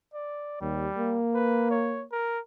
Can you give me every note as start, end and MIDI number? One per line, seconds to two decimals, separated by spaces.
0.14 0.61 74
0.61 0.87 39
0.61 1.23 55
0.98 2.06 58
1.34 1.66 71
1.71 2.04 73
2.12 2.39 70